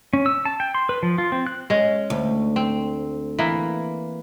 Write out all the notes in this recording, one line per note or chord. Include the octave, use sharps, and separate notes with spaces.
C#4
E6
A5
G5
C6
B4
F3
F4
C4
F#6
G#3 C#4
D2
C4
E3 A#3